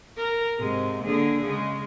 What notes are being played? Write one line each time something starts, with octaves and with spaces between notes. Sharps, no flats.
A#4
G#2 C3 G#3
D3 A#3 G#4
C#3 G#3